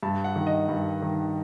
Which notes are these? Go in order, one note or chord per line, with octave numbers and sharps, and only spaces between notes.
G2 A5
F#5
D#3
D#5
G2
D#3